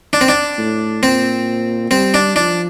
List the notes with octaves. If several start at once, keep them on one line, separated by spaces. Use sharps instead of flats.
D4
C4
D4
A2
A#2 C4
G3 C4
D4
F3 D4